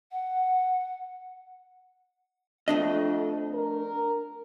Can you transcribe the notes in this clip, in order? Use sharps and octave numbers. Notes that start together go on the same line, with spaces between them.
F#5
F2 A3 D4 D#5
A#4